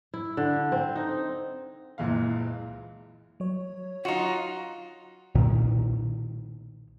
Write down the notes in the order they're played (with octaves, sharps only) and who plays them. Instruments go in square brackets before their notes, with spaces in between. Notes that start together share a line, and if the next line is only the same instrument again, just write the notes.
[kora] E4
D3
C4
D#4
[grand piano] F#1 C#2 A#2 E3 G#3 F5
[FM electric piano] F#3 C#5
[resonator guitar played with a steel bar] D#4 F#4 [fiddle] F4
[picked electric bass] B1 A#2 D#3